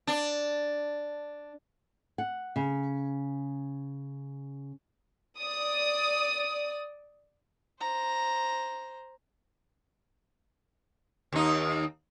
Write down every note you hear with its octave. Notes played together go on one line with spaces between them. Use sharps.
D4
F#5
C#3
D5 D#6
C5 A#5
D#2 D#4